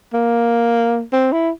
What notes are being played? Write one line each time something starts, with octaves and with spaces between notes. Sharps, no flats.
A#3
C4
E4